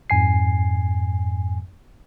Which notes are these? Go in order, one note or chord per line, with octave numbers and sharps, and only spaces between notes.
F2 G#2 G#5 C7